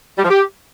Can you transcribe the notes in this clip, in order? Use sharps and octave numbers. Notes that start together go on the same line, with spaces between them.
G3
F3
G4